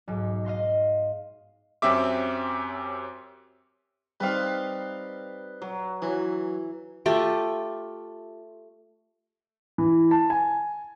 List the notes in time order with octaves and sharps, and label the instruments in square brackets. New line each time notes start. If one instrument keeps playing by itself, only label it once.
[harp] B1 G#2
D#5 F5 C6 A#6
[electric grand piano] F#2 C4 C#4 G4 E5 D6
[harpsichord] G3 C4 D#4 [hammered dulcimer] B4 F5
[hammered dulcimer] F#3
[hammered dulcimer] E3 [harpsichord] F#3
[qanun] A3 F4 G4 D6
[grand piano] E3
A5
G#5